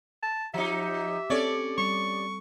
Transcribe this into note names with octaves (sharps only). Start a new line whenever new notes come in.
A5
F3 D#4 G4 E5
C4 C#4 A4 C#5 D5
G3 C#6